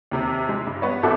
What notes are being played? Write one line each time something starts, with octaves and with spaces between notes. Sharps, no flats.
D#2 C3 G4
G#3
G2
B3 B4 C#5
G#1 F#4 A4 E5 D6 F#6